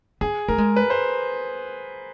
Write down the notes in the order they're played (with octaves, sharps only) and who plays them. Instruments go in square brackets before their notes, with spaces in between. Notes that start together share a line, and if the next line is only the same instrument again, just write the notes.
[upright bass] B3 [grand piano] G#4
[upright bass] A3 [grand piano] A#4
[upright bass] G#3
[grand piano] B4
C5